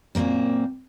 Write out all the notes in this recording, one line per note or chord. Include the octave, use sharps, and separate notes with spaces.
F#2 A#2 C#3 A#3 C4